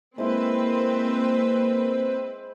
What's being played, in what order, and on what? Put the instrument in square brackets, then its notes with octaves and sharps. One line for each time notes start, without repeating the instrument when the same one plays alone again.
[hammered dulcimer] G#3 E4 [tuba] A#3 [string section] C4 B4 [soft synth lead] C5